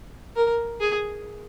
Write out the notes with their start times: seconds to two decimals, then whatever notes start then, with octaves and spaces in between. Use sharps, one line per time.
0.36 A#4
0.80 G#4